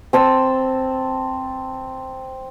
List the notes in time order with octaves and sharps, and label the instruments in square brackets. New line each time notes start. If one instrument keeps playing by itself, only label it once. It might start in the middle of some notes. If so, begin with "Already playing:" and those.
[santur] C4 A5 E6